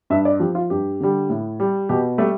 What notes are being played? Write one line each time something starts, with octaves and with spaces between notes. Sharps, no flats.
G2 E5
D5
F3 G4
F4
G2 G4
D3 G3
A2
G3
B2 G4
G3 A3